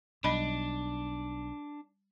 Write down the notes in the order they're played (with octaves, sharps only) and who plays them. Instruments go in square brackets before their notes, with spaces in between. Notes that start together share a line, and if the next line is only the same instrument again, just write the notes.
[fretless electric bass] B1 [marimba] G3 D#5 B5 [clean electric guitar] D4